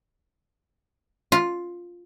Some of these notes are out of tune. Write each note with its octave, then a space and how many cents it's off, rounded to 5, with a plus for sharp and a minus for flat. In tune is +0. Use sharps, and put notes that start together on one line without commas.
F4 +5